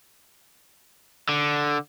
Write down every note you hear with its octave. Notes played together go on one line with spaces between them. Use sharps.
D3